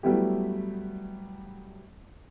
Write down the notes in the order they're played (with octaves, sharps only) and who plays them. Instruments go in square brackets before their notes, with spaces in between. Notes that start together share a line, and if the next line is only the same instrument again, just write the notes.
[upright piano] F#3 G3 A3 B3 E4 G4